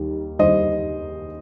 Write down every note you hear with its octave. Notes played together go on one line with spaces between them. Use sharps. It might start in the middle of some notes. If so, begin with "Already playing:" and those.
Already playing: D#2 D#3 G3
D#2 D#3 G3 C5 D#5